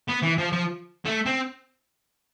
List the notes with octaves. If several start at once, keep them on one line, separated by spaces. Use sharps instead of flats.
B3
E3
F3
F3
A3
C4